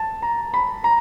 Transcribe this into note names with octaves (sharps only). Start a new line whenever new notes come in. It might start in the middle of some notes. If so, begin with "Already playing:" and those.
Already playing: A5
A#5
B5
A#5